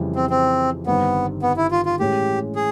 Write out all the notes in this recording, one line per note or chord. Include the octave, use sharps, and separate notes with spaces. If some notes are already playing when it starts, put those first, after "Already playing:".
Already playing: F2 C#3 E3 G3
C4
C4
G1 G2 D#3 G3 B3 C4
B3
E4
F4
F4
A2 E3 G#3 C#4 G4
G#4